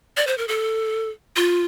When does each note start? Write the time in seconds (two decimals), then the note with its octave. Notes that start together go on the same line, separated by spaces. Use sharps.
0.17 D5
0.27 C5
0.38 A#4
0.48 A4
1.36 F4